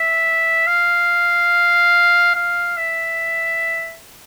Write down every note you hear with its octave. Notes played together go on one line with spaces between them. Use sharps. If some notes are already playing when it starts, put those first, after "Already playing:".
Already playing: E5
F5
F5
E5